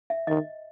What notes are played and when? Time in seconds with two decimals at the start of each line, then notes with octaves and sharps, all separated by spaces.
0.10 E5
0.27 D#3 D#5